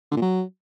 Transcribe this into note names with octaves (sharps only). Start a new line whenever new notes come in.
D3
A#2
F#3